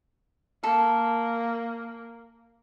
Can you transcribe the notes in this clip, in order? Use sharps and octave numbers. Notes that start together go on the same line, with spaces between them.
A#3 A4